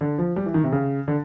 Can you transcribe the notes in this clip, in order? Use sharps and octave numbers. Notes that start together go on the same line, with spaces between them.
D3
F3
G3
E3
D#3
C3
C#3
D3